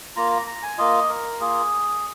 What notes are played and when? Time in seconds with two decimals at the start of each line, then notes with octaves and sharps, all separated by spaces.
0.16 A#3 F4 A#5
0.32 A#5
0.47 A#5
0.63 G#5
0.78 A#3 F4 D#5
1.09 A#4
1.40 A#3 F4 G#4